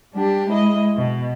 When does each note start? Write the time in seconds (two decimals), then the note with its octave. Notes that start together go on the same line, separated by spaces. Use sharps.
0.13 G3 D4 G4
0.47 G#3 E4 D#5
0.96 B2